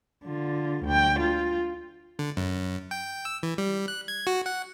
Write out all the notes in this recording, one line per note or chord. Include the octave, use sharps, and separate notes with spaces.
D3 F4
D2 G5
F4
D3
F#2
G5
E6
E3
G3
F#6
G#6
F#4
F#5